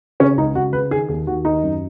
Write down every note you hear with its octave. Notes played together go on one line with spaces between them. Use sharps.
C#3 C#4
C#2 D#4
C#2 F#4
C#3 B4
D#3 G#4
D#2 G#4
D#2 F#4
D#3 D#4
F#2